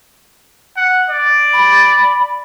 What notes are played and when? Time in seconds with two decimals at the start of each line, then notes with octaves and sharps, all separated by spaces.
0.76 F#5
1.09 D5
1.53 B5